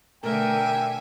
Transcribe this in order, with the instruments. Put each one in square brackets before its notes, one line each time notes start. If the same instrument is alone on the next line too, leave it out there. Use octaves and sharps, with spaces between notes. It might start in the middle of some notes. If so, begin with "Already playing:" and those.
[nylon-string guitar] B2 A3 [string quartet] D3 E5 G#5 [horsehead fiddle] A#4 [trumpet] G5